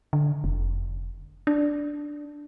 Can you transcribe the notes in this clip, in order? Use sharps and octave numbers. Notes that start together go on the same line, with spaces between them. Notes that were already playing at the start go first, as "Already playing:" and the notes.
D3
F1
D4